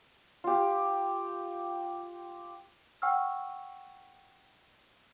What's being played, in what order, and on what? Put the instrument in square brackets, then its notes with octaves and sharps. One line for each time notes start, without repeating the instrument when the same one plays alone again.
[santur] F4 G4
[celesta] F#5 G5 C#6 E6 F6